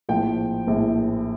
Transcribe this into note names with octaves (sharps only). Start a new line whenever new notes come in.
A#1 A2 F3 G5
A#1 A2 F3